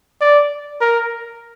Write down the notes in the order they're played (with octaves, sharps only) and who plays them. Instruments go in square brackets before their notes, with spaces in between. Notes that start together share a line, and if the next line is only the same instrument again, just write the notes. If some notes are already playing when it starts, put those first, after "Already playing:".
[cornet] D5
A#4